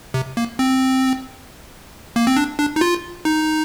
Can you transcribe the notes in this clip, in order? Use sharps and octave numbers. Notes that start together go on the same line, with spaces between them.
C3
A#3
C4
A#3
C4
D4
D4
D#4
F4
D#4